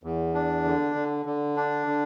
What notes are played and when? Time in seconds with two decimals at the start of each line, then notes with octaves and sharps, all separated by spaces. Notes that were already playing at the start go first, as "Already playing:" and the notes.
0.03 E2
0.34 D4
0.65 D3
0.95 D3
1.25 D3
1.57 D4
1.87 D3